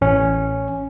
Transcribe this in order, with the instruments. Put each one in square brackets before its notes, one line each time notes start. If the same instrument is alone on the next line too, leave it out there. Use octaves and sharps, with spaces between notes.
[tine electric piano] A1 C#4